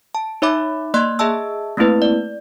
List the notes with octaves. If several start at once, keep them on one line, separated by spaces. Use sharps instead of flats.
A5
D#4 C#5 E5 B5 D6
A#3 D5 D#5 C6 F#6
G#4 D#5 E5 A5 E6
A3 A#3 C4 E4 B4
D5